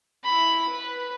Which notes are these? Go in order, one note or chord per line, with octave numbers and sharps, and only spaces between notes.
E4 B5
B4